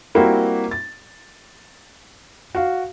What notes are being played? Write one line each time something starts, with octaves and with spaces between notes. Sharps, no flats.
G3 A#3 C4 E4 F#4
A6
F#4 F5